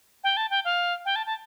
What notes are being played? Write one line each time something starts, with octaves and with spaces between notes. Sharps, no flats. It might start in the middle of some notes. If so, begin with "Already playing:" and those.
G5
A5
G5
F5
G5
A5
A5